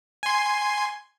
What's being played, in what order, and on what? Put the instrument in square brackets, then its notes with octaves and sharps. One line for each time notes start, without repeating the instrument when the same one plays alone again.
[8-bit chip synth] G#5 C6